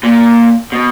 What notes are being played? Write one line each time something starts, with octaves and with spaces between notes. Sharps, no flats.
A#2
B2